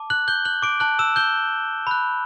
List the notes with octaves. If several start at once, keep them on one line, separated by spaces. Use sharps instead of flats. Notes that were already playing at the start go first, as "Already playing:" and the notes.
Already playing: A5 D6
F#6 F#7
G6 G7
F#6 F#7
D6 D7
A5 D6 F#6 G6 F#7
E6 E7
G6 G7
B5 F#6